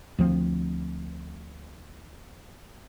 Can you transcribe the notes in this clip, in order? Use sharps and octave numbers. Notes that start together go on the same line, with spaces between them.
D2 F3 G3 C4